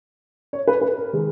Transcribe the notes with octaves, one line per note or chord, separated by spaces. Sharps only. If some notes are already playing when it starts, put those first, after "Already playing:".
C#5
B4
B4
A#4
D#3 G#3